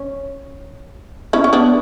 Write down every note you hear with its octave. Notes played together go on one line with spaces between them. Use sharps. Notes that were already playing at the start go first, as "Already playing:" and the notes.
Already playing: C#4
C#4 E4
C#4
B3 D4